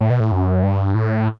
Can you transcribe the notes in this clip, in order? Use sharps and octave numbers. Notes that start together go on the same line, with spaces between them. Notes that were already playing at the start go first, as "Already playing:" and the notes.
A2
B2
A2
F#2
G2
A2